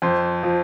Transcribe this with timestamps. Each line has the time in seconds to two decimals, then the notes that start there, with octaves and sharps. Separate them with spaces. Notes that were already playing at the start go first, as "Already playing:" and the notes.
0.02 F2 C5
0.43 F3